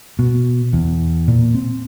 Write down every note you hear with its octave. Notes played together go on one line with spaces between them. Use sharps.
B2
E2
A#2
C4